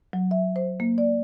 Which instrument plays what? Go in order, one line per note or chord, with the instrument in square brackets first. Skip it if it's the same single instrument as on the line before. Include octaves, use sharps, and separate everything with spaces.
[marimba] F#3
E5
C5
A#3
D5